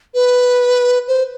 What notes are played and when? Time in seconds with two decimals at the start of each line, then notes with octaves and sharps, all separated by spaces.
0.14 B4
1.08 C5